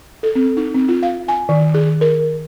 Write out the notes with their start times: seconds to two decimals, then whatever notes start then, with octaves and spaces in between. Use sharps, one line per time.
0.23 A4
0.35 C4
0.57 D#4
0.74 C4
0.89 F4
1.03 F5
1.28 G#5
1.49 D#3
1.74 G#4
2.01 A#4